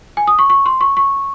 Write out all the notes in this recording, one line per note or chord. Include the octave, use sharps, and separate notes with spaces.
G#5
D#6
C#6
C#6
C6
C#6
C#6